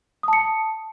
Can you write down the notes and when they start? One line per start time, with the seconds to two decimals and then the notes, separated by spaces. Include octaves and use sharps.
0.23 D#6
0.28 A5
0.33 C#7